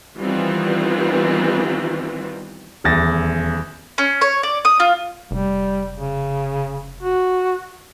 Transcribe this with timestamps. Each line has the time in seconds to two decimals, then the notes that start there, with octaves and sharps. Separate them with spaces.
0.18 D#3 E3 G3 B3 C4 F4
2.84 D#1 E2 A6 A#6
3.98 C#4
4.21 C#5
4.43 D5
4.65 D#6
4.80 F4
5.31 F1 G3
5.97 C#3
7.03 F#4